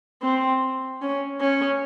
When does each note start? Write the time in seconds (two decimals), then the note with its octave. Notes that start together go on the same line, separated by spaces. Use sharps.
0.22 C4
1.02 C#4
1.40 C#4